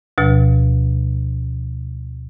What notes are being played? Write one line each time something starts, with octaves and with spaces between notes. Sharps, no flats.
D2 B2 F3